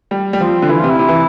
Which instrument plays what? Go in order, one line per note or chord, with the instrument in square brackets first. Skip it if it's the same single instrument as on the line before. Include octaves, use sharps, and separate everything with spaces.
[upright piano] G3
G3
[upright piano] F3 [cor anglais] C4
[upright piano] D3
[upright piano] E3 [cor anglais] E4
[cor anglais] F4
[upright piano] C3
[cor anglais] E4
[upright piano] C3
E3